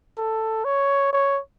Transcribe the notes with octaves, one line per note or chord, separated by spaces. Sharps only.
A4
C#5
C#5